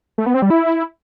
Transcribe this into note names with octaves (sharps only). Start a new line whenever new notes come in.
A3
B3
C4
G3
E4